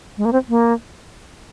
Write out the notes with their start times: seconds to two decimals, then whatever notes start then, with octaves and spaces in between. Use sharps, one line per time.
0.17 G#3
0.25 A#3
0.32 C4
0.49 A#3